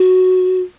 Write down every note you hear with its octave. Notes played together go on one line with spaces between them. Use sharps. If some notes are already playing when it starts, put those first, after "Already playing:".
Already playing: F#4